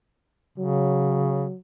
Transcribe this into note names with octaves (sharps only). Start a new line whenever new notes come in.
C#3 F#3